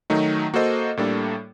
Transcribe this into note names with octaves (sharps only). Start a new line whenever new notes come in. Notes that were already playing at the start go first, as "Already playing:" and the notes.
D#3 F#3 A3 D#4 F#4
A#3 F#4 A4 C5 D#5
A2 G3 A#3 D4 A4